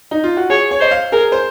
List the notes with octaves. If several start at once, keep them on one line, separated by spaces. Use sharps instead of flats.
D#4
F4
F#4
G#4 C#5
C#5
C5 D#5
F5
G#4 A#4
C5